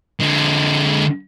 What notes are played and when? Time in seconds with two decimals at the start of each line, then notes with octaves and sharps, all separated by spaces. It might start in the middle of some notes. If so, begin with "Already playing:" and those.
0.20 D3 G#3